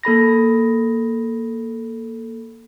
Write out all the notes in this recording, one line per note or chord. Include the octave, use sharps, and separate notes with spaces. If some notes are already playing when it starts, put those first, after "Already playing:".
A#3 A4 B5 A#6